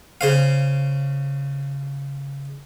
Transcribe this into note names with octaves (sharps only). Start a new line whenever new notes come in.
C#3 C5 F5